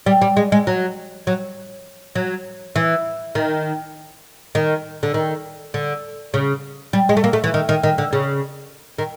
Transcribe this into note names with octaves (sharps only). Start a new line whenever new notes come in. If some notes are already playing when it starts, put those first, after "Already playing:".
G3
G3
G#3
G#3
F#3
F#3
F#3
E3
D#3
D#3
D3
D#3
D3
C#3
G3
G#3
A3
A#3
A3
E3
D#3
D#3
D#3
D3
C#3
D#3